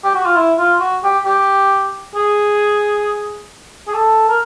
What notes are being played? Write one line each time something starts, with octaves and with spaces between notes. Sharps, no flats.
G4
F#4
F4
E4
F4
F#4
G4
G4
G#4
G#4
A4
A#4